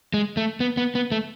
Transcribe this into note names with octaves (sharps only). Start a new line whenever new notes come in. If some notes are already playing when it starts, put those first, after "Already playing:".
G#3
A3
B3
B3
B3
A3